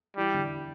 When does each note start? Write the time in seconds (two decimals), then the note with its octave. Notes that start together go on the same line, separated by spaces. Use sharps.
0.17 E3 G3 E4
0.34 D3 D4